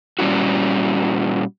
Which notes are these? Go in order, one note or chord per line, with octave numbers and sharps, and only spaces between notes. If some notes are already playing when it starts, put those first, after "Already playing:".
A#2 G3 C#4 E4 F#4